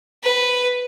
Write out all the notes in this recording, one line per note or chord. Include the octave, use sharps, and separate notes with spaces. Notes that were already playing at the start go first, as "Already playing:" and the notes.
B4